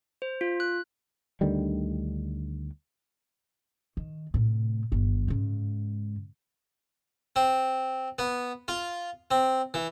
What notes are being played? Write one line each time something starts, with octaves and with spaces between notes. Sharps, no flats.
C5
F4
F#6
D2 D3 D#3 G3
D#3
A2 C3
G1 D#3
G#2 C#3
C4
B3
F4
C4
E3